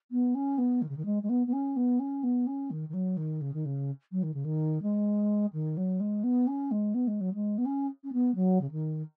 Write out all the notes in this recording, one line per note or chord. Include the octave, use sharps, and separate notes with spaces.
B3
C#4
B3
D#3
C#3
D#3
G#3
G#3
B3
B3
C#4
B3
C#4
B3
C#4
D#3
D#3
F#3
D#3
C#3
D#3
C#3
F#3
D#3
C#3
D#3
G#3
D#3
F#3
G#3
B3
C#4
G#3
B3
G#3
F#3
G#3
B3
C#4
C#4
B3
F#3
C#3
D#3